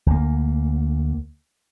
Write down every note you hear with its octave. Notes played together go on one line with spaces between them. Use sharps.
D2 A#3